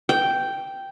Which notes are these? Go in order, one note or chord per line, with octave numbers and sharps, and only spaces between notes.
G5